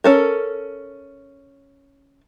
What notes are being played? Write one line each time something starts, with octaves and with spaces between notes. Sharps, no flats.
C#4 A4 A#4